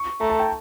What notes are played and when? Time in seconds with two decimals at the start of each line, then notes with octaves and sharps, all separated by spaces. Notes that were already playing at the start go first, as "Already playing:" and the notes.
Already playing: C#6
0.21 A3 A#5
0.30 A5
0.39 G5